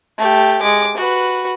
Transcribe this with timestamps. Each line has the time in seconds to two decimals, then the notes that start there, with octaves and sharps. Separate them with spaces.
0.18 A3 G4
0.62 G#3 D6
0.97 F#4 B4